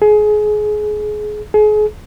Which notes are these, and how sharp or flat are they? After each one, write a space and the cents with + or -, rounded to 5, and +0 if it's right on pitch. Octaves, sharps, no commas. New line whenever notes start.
G#4 +25
G#4 +35